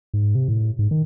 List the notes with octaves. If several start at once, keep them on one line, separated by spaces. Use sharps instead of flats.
G#2
C3
A2
G#2
D#3